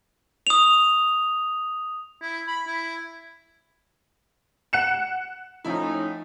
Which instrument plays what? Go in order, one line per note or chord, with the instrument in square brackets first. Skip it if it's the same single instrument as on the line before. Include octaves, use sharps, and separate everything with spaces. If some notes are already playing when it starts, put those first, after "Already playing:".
[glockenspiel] D#6 F7
[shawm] E4
B5
E4
[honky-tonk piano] F#5 F#6 C#7 E7
[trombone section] A2 C#4 D#4 [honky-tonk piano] F3 E4